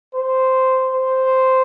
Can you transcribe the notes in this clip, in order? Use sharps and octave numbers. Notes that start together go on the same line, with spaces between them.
C5
C5